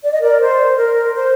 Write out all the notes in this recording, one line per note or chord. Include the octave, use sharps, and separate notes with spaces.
D5
D#5
A#4 D5
C5
A#4
C5